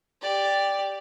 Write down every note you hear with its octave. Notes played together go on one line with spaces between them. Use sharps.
G4 D5